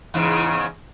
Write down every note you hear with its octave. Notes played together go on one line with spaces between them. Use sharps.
E2 G#2 C#3